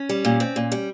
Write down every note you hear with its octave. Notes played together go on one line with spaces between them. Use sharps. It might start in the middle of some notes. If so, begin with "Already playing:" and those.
Already playing: C#4
G3
A#2
C4
A#2
G3